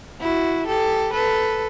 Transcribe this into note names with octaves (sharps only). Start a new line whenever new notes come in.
E4 F#4
G4 A4
A4 B4